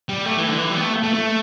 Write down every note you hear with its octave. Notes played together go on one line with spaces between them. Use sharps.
G3
A3
E3
D3
E3
G3
B3
A3
A3
A3